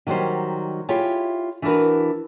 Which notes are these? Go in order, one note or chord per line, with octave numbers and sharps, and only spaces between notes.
D#3 F#3 G3 G4 C5
E4 F4 G4 G#4 C#5
E3 D4 F#4 A#4 B4